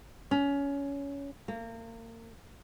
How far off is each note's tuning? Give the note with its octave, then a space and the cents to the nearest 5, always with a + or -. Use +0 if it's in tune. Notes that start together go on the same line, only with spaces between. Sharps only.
C#4 +20
A#3 -35